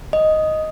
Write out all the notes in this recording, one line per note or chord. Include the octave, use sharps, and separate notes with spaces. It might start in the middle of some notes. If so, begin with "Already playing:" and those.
D#5